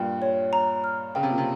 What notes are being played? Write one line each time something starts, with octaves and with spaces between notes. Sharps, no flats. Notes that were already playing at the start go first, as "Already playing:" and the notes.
Already playing: G2 A#2 G5
C#5
A#5
F6
C#3 G5
C3
A#2
C3